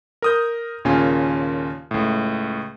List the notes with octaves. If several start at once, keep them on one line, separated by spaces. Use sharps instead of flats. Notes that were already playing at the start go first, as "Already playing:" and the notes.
A#4 D#6 G6
D#2 A#2 C#3 C#4 F4 G#5
C#2 A2